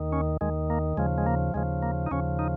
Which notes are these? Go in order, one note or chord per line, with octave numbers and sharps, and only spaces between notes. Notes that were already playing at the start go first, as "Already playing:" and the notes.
Already playing: D#2 D#3
C#4
D#2 D#3 G#3
A#3
D#2 C#3 F3 G#3
G#3
A#3
D#2 C#3 F3 G#3
A#3
D#4
D#2 C#3 F3 C#4
D#4